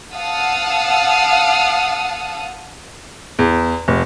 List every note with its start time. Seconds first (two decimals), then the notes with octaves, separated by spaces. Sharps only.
0.13 F5 F#5 A5 D#6 E6
3.39 E2
3.88 F1